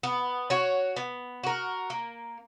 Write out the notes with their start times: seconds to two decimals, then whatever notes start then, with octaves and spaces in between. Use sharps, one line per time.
0.03 B3
0.50 F#4 C#5
0.96 B3
1.44 F#4 A#4
1.90 A#3